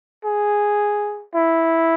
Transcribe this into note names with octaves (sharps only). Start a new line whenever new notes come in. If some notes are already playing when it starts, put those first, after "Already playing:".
G#4
E4